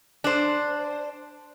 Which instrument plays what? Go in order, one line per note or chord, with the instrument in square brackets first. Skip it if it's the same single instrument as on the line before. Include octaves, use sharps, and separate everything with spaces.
[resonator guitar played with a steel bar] D4 C5